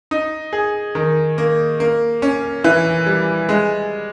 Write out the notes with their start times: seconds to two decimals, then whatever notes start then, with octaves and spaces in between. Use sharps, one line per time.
0.11 D#4
0.53 G#4
0.95 D#3
1.38 A#3
1.80 A#3
2.22 C#4
2.64 E3
3.06 G3
3.49 G#3